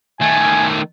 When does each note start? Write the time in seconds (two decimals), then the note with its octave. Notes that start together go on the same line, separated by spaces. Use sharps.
0.21 D#3 A3 G#5